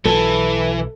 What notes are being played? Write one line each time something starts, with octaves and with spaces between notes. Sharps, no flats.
B1 E3 F#3 A4